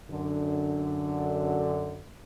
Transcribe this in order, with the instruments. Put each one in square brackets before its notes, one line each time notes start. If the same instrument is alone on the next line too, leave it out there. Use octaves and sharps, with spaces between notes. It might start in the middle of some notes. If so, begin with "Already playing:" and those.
[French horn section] F#2 D3